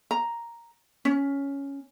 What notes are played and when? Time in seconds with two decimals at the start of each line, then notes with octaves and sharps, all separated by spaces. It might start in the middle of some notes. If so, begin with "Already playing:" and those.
0.11 A#5
1.05 C#4